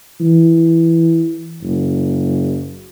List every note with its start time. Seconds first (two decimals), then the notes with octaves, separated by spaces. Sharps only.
0.20 E3
1.63 F#1